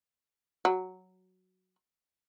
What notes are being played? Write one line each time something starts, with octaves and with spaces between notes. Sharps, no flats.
F#3